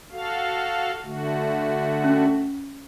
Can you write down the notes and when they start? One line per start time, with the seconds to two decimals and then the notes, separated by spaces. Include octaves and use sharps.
0.11 F#4 A4 F5
1.03 D3 A3 F#4
2.04 C#4